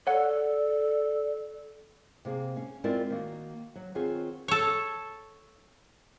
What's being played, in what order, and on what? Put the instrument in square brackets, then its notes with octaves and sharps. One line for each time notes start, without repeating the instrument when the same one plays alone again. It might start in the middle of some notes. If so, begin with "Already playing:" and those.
[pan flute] A4 [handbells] C#5 F#5 [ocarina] D5
[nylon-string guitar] C3 A#3 G#4
C#4 F5
G#3 C4 E4 F4 A#4 D5
D#3 A#3 F#4
F#3
D#3 B3 C4 F4 G#4 C#5
[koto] A4 C#5